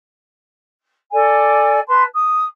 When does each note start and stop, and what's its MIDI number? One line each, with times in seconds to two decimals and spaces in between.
1.11 1.79 69
1.11 1.79 74
1.11 1.79 80
1.87 2.03 71
1.87 2.03 81
1.87 2.03 84
2.13 2.43 87